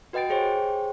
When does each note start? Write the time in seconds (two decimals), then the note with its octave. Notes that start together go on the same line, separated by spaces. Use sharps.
0.13 F#4 B4 D#5 G5 A6 D7
0.29 G4 G#4 C5 C#5 G5